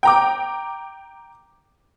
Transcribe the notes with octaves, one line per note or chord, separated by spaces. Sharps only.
G5 A#5 D6